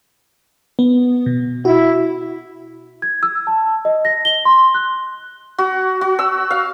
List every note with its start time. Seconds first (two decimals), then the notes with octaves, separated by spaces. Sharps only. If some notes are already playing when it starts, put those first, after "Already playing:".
0.79 B3
1.26 B2
1.65 E4 F#4
3.02 G#6
3.23 E6
3.47 A5
3.85 D#5
4.05 A#6
4.25 G7
4.45 C6
4.74 F#6
5.58 F#4
6.01 F#4
6.19 E6
6.51 F5